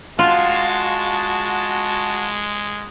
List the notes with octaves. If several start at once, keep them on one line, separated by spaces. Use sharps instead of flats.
G#3 F4 F#4 A5